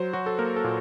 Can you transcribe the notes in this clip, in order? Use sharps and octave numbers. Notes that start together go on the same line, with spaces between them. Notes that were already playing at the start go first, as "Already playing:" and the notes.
Already playing: F#3 C5
F#3 F#4
A4
A#3 A#4
A4
A#2